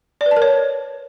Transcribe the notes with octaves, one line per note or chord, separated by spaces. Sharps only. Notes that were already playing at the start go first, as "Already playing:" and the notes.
D5
B4
A5
A#4
C#5